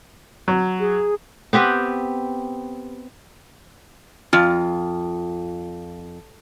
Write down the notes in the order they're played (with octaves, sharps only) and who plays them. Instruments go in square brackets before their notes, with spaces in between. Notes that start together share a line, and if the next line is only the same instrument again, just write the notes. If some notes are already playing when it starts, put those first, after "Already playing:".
[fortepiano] F#3
[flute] G#4
[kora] B3 C4 G4 B4
[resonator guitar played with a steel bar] F2 [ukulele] F4